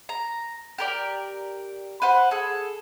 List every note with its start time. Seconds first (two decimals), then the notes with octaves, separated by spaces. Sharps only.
0.09 A#5
0.78 G4 A#4 D5
2.02 B4 C5 F#5
2.31 G#4 A4